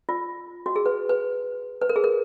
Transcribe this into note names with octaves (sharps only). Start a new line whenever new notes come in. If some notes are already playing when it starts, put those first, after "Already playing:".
F4
F#4
G#4
B4
B4
B4
A#4
G#4
A#4